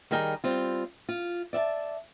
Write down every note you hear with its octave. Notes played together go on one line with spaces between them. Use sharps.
D#3 G3 G#4 A#4 D#5 G5
G3 C4 F4
F4
D5 E5 F#5 A5